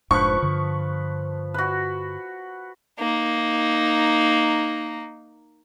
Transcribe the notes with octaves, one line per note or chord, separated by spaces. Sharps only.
F1 G#2 F3 D4 B4 C#6
G2 D3
F#4 B4
A#3 D#4